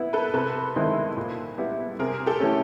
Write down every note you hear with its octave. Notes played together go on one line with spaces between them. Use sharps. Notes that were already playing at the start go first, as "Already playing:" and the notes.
Already playing: B3 E4
A4 B4
C3 A4 B4
D#3 G#3 C4 E4
A#2
G3 B3 E4
C3 G#4 A#4
G4 A4
E3 A3 C#4